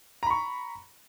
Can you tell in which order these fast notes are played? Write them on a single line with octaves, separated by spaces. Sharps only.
A#5 B5 C#6